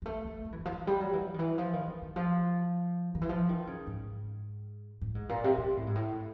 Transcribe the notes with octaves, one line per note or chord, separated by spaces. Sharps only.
G#3
A3
A3
A3
E3
D#3
F3
E3
G3
F#3
E3
F3
D#3
E3
F3
D#3
D#3
D#3
F3
D#3
E3
F3
D#3
C#3
G#2
A2
G#2
A#2
C3
C#3
A2
G#2
A2